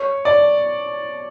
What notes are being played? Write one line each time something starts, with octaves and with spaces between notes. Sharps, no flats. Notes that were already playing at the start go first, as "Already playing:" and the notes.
Already playing: C#5
D5